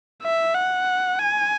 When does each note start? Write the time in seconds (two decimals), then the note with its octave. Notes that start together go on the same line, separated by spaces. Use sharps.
0.23 E5
0.55 F#5
1.19 G#5